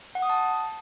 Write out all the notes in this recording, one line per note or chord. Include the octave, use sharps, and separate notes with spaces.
F#5
D#6
A5